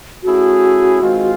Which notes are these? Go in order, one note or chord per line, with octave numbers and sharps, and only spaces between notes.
A3 C#4 E4 F#4 G#4
D#3 G#3 C4 F4